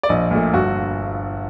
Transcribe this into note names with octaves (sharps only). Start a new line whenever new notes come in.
D5
A#1 D#5
A#2 A3
G1 F#4